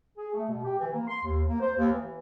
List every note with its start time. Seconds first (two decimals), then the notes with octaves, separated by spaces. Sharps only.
0.17 G#4
0.33 A3
0.48 B2
0.64 G4
0.78 E3
0.92 A#3
1.07 C6
1.22 D#2
1.46 A#3
1.60 C5
1.76 D#2
1.92 E3